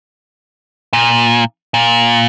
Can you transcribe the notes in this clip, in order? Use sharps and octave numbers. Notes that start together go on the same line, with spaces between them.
A#2
A#2